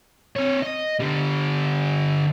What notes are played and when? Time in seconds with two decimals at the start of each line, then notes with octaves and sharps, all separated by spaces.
0.36 C4 C#5
0.63 D#5
1.00 D3 G3